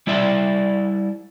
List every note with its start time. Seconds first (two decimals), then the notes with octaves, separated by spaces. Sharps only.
0.07 G3 E4 D5 E5